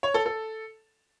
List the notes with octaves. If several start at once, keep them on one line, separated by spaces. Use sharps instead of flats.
C#5
A4
A4